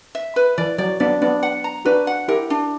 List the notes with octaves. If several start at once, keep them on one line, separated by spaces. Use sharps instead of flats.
E5
B4
E3 D5
F#3 D5
B3 D4 D5
B3 D4 D5
F#5
A#5
D4 F#4 B4
F#5
E4 G4 A#4
D4